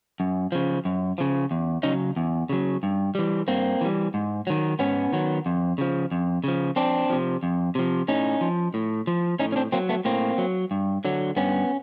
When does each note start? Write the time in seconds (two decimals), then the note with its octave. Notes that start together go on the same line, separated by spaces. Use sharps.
0.20 F#2
0.52 C#3 F3
0.85 F#2
1.18 C#3 F3
1.51 E2
1.83 C#3 F#3 C#4 D#4
2.16 E2
2.49 C#3 F#3
2.83 G2
3.15 E3 G3
3.48 G2 A#3 C4
3.81 E3 G3
4.14 G#2
4.47 D#3 F#3
4.79 G#2 B3 C#4
5.13 D#3 F#3
5.46 F2
5.78 C#3 F3
6.11 F2
6.44 C#3 F3
6.76 F2 C4 D4
7.09 C3 F3
7.43 F2
7.75 C3 F3
8.08 A2 C#4 D#4
8.41 F3
8.74 A2
9.07 F3
9.39 A2 C#4 D#4
9.52 C#4
9.56 C4 D4
9.72 F#3 A#3 C4
9.89 A3 B3
10.05 A2 A#3 C4
10.38 F#3
10.71 G2
11.05 D3 F#3
11.36 G2 B3 C#4